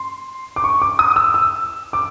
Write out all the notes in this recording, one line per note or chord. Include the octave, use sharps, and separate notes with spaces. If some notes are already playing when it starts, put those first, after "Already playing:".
Already playing: C6
D6
C#6
D6
D#6
E6
E6
D6